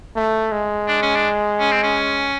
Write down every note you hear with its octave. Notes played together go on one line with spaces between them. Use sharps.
A3
G#3
D4
C#4
D4
C#4
C4
C#4